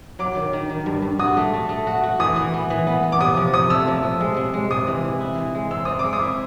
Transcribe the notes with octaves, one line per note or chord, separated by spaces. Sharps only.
F#3 D6
D#3
D#3
D#3
G2
G2
F#4 D#6
A3
A3
A3
F#4
F#4
E3 D#6
E3
B3
E3
B3
B3
D6
C3 D#6
F3
C3 D#6
A3 E6
F3
C3
G#3
C3
G#3
C3 D#6
E3
E3
E4
E3
G#3
C4 E6
C4 D#6
G#3 D6
D#6
E4